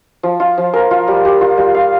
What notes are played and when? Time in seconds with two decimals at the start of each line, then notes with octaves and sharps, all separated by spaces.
0.23 F3
0.40 F4
0.58 F3
0.73 A#4
0.91 F4
1.08 G3
1.25 G3
1.41 F4
1.57 G3
1.75 F5